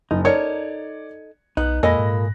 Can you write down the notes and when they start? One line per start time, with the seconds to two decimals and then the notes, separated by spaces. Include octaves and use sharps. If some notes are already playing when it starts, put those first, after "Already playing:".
0.11 F#1 D#4
0.25 D#4 A4 A#4 C#5 D5 G#6 C#7
1.57 B1 B3 D#4 F#6
1.83 F2 A#2 G#3 A#3 A4 D#5 B5 A#6
1.99 G#2